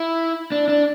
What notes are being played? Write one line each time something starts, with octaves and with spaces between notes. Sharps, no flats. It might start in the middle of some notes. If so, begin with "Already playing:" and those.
Already playing: E4
D4
D4